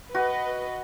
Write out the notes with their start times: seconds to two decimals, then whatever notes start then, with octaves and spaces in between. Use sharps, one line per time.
0.15 F#4 B4 D#5